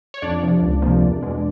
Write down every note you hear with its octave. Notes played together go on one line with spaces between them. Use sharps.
C#5
F2 D4 D5
C3 F3
C#2
C3 F3 A#3
E2
B2 G#3